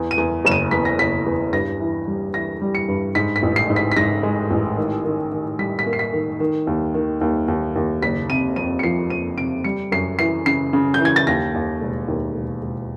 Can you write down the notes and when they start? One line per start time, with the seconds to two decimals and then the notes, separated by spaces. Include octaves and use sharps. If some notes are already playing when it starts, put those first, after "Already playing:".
Already playing: E2
0.11 D#7
0.18 E2
0.45 F#1 E7
0.52 D#7
0.71 E2 B6
0.85 A#6
0.99 F#1 B6
1.26 E2
1.53 G2 A#6
1.80 E3
2.07 G3
2.34 E3 A#6
2.62 G3
2.75 C#7
2.88 G2
3.15 G#2 B6
3.36 B6
3.43 A1
3.56 C7
3.70 G#2
3.76 B6
3.92 B6
3.97 G#2 A#6
4.23 G#3
4.51 A1
4.77 D#3
5.05 D#3
5.32 D#3
5.59 G3 B6
5.79 B6
5.86 A#3
5.93 C7
5.99 B6
6.13 D#3
6.40 D#3
6.67 D#2
6.94 D#3
7.21 D#2
7.48 D#2
7.76 D#2
8.02 F#1 B6
8.29 C3 D#7
8.56 F2 D#7
8.79 C#7
8.83 F3 C7
9.10 F2 D#7
9.38 C3 D7
9.64 G3 C#7
9.92 F#2 C7
10.19 E3 C7
10.46 C#3 C7
10.73 C#3
10.94 G6
11.00 E3
11.05 G#6
11.16 A6
11.27 D#2 A#6
11.54 D#2
11.81 E1
12.08 D#2
12.35 E1
12.62 E1